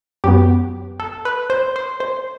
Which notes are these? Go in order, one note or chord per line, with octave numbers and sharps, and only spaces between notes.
F#2 F#3 B3 G4
A4
B4
C5
C5
C5